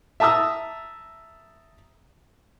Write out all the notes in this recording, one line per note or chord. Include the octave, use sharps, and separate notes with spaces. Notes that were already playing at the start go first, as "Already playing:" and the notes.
E5 A5 A#5 D#6 E6